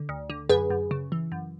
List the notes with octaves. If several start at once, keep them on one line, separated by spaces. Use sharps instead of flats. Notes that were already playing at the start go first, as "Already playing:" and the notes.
Already playing: D3
D2
D3
F#2 G#4 B4
F#2
C#3
E3
F#2